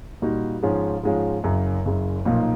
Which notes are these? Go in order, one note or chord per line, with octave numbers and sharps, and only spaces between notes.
A#2 G3 A#3 D#4 F#4
G#2 F3 G#3 C#4 F4
G#2 F3 G#3 C#4 F4
F#1 F#2 C#3
F#1 F#2 C#3
B1 A#2 F3 A#3 D#4